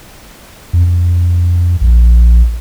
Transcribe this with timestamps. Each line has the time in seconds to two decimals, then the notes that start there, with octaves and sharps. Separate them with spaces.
0.73 F2
1.81 A#1